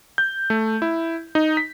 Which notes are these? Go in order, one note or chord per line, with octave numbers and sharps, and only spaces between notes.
G6
A3
E4
D#4
B6